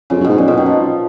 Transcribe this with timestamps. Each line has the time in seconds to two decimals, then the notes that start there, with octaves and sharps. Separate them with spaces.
0.10 F2 C#3
0.20 F#2
0.24 G#2 B2
0.38 F#2 A#2
0.48 F2 B2
0.57 F#2 D#3
0.66 F3